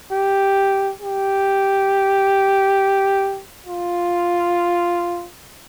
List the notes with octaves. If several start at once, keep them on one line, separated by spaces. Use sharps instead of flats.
G4
G4
F4